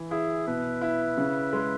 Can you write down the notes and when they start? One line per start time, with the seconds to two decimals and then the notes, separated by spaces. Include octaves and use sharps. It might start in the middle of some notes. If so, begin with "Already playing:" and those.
Already playing: E3
0.11 E4 G#4
0.47 B2 B4
0.81 E4
1.17 C#3
1.53 G#3